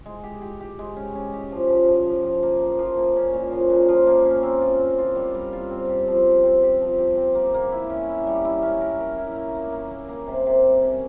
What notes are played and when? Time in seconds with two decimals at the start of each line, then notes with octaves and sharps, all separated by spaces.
0.06 G#3
0.23 G4
0.42 G4
0.61 G4
0.79 G#3
0.97 C#4
1.15 C#4
1.33 G4
1.52 F3
1.70 F3
1.88 F3
2.06 F3
2.24 F3
2.43 A#3
2.62 F3
2.79 F3
2.97 A#3
3.16 C#4
3.34 A#2
3.52 F3
3.70 A#2
3.89 F3
4.07 A#3
4.25 C#4
4.43 C4
4.61 F4
4.79 C4
4.98 F4
5.16 G3
5.35 G3
5.53 F4
5.71 C4
5.89 G4
6.07 F3
6.26 G4
6.44 C4
6.63 G4
6.81 F3
6.99 G4
7.17 C4
7.35 A#3
7.54 A#3
7.72 E4
7.90 C#4
8.09 E4
8.27 G3
8.45 E4
8.63 C#4
8.81 A#4
9.00 A#4
9.18 E4
9.36 A#3
9.55 A#3
9.72 A#3
9.91 A#3
10.09 A#3
10.27 C3
10.46 C3
10.64 G3
10.82 C#4